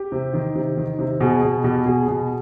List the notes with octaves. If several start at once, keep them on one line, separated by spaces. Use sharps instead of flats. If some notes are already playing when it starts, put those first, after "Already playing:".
Already playing: G4
C3
D#3
C3
D#3
C3
B2 G#4
B2 G#4
B2 G4
B2 G#4
B2